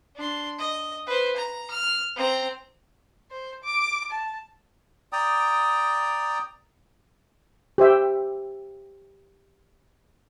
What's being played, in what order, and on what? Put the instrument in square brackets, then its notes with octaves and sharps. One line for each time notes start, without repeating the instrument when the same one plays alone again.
[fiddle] D4 C6
D#5
B4 C5
A#5
F6
C4 A#5
[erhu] C5
D6
A5
[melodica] D5 G5 A#5 D#6
[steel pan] G4 C5 E5 G5